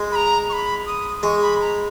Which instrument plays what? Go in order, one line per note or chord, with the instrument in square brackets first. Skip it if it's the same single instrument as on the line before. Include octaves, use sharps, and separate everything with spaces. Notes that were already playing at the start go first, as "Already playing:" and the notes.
Already playing: [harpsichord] G#3
[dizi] B5
A#5
C#6
B5
D#6
[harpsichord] G#3 [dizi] C#6
[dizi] B5
A#5